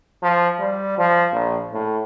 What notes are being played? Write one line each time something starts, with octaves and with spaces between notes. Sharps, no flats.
F3
G3
F3
A#1
A2